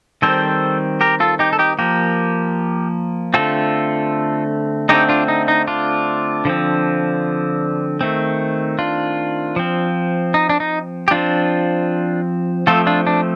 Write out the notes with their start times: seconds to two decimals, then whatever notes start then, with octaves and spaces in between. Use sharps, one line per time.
0.22 D#3 G3 C4 A4 C5
1.01 G4 A#4
1.20 F4 A4
1.39 D#4 G4
1.53 A4
1.59 D#4 G4
1.79 F3 A#3 G4 A#4
3.34 D3 A3 C4 F4 A4
4.89 D3 A3 C4 D#4 G4
5.09 D4 F4
5.28 D#4
5.48 D#4
5.67 D4 F4
6.45 D3 F3 C4
8.01 D#3 A3 C4
8.79 D4 F4
9.56 F3 C4
10.34 D#4
10.50 D4
10.60 D#4
11.08 G4
11.11 F3 C4 D4 F4
12.67 F3 A3 C4 F4 A4
12.87 D4 F4
13.07 D4